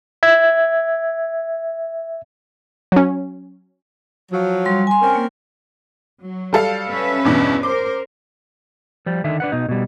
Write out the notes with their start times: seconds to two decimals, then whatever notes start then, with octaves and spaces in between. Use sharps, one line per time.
0.23 E5 G#6
2.92 F#3 C#4
4.32 F3 F#3
4.66 G3 C6
4.87 G#5 C6
5.02 C4 C#4 A#4
5.16 A#3
6.23 F#3
6.53 G3 A4 F5
6.89 C#4 B4 E5
7.25 E2 G2 B2
7.63 A#4 C5 D6
9.06 F3 G3
9.24 D3 D#3 E5
9.40 D4 B4 F#5
9.52 B2 D#4
9.69 B2 G3